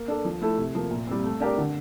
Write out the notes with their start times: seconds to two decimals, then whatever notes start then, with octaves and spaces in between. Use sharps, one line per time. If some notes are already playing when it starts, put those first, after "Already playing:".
Already playing: A#3
0.08 D4 A4
0.25 F3
0.41 A3 E4 A4
0.58 C3
0.75 F3 A#3
0.91 A#2
1.07 G3 C4
1.24 A3
1.40 D4 G4 A#4 D5
1.57 D3